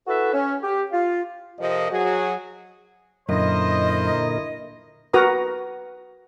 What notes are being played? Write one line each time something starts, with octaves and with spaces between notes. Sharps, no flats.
E4 F#4 A4 B4 E5
C#4
G4
F4
F2 C3 F3 G4 A#4 D#5
F#3 F#4 G#4
F#2 A#2 D3 E4 A#4 C5 D#5
F#4 A#4 B4 A#5 D#6